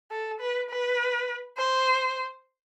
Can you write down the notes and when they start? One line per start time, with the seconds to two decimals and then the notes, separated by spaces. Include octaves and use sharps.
0.11 A4
0.40 B4
0.70 B4
1.58 C5